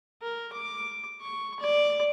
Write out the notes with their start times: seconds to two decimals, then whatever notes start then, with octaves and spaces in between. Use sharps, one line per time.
0.22 A#4
0.53 D6
1.21 C#6
1.60 D5